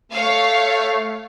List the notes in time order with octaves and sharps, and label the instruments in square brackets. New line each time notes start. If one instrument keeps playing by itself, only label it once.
[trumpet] A3 [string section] C#5 F5